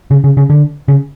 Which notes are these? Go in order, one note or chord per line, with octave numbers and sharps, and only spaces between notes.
C#3
C#3
C#3
D3
C#3